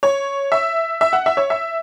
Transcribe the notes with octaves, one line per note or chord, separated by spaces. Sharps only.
C#5
E5
E5
F#5
E5
C#5
E5